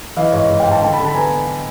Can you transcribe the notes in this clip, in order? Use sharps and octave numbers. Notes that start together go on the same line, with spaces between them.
E3 D#5 F5
G#2 C#5 D#5
G#2
F5 G5
G#2
G5 A5
D3 G5 A5
A5 B5
D3
A5 B5
B3 G#5 A#5